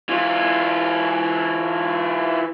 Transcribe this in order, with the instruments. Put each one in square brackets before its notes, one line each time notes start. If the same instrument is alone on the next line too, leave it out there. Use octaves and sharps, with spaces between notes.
[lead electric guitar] E3 F4